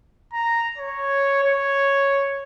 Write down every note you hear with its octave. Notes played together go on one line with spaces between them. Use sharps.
A#5
C#5
C#5